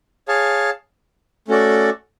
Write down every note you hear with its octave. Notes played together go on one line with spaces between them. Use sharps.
G#4 C#5 F5 A5
A3 C#4 F#4 A4 D5